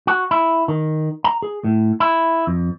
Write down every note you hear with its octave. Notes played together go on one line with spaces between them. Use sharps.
F#4
E4
D#3
A#5
G#4
A2
E4
F2